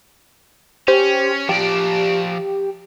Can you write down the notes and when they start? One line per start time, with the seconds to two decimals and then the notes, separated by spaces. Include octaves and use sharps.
0.88 C#4 G4 C5
1.49 F3 G4 D5